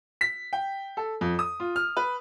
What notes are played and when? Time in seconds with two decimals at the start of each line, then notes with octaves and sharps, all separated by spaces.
0.21 B6
0.53 G5
0.97 A4
1.21 F2
1.39 D#6
1.60 F4
1.76 F6
1.97 B4